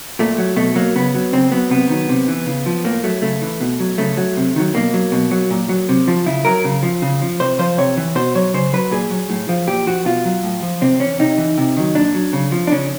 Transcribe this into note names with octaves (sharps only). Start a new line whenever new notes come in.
A#2 A3
F#3
B2 A3
F#3 A#3
C#3 B3
F#3
C#3 C4
F#3 B3
C3 B3
D#3 F#3
C3
E3
C#3
F3
A2 A#3
F#3 A3
C#3 A3
E3
B2
F#3
C#3 A3
F#3
C3
D#3 F#3
B2 A#3
F#3
B2
F#3
A#2
F#3
C3
F3
C#3 E4
F#3 A#4
C#3
F3
C#3
F3
C3 C5
F3 C5
C3 C#5
E3
B2 C5
F#3 C#5
C#3 C5
F#3 B4
A#2 G#4
F#3
A2
F3
A#2 G4
F3 F#4
B2 F4
F#3
A2
F3
C3 C4
E3 C#4
C3 D#4
E3
C3
D#3 F#3
A#2 D4
F#3
C#3
F3
D4
C#3 C#4